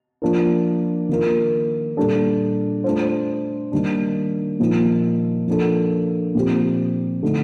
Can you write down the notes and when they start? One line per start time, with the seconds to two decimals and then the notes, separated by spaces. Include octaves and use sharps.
0.22 F3 A#3 D4 F4 A#4
1.09 D#3 A#3 F4 A#4
1.97 A#2 G3 D4 A4
2.84 A3 D4 F4 C5
3.72 D#3 G3 A#3 D4
4.60 A#2 F3 A#3 D#4
5.48 F3 A#3 D4 A4
6.35 A#2 F3 C4 G4
7.23 D3 A3 D#4